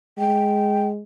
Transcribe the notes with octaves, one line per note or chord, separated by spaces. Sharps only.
G#3 G5